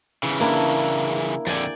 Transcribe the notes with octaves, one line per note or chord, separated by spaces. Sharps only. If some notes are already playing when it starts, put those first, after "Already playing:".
C#3 E3
A#3 D4 E4
F2 D3 D5 G5 G#5